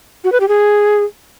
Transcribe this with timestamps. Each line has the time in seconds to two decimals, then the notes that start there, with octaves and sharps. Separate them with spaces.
0.24 F#4
0.32 B4
0.40 G4
0.48 G#4